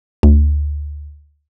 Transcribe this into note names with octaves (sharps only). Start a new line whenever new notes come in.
D2